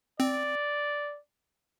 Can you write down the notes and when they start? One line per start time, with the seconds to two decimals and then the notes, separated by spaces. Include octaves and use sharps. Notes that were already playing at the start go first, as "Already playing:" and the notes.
0.20 C4 D5